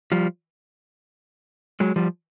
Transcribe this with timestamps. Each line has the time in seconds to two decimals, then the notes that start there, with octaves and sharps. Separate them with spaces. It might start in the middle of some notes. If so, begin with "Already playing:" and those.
0.12 F3 G3
1.80 F#3 G#3
1.96 F3 G3